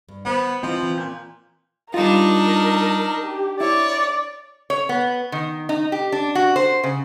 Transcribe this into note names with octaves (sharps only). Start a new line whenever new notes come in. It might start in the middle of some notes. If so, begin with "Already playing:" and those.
G2
D#3 B3 C5 F#5
E3 F3 C4 E4 D#5
E3 C#4
A#2 G6
G3 D4 D#4 F4 A#4
G4
E4 C#5 D5
C#5
B3
D#3
D#4
G4
D4
F#4
C5
C#3